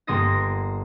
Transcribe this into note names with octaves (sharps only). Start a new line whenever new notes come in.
G1 A#3 A#4 C6 D#6 A#6